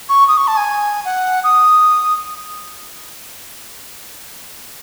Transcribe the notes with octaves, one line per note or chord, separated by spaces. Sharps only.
C#6
D#6
C#6
A5
G#5
F#5
D#6